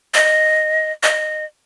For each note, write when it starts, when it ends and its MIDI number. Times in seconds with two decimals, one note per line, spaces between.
0.14 0.92 75
1.03 1.45 75